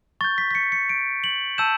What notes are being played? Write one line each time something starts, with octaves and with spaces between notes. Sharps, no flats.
C#6 G6 A6
B6
B6
C#7
C#7
D7
F#7
A5 E6 G6 E7